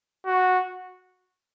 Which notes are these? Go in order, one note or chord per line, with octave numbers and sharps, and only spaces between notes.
F#4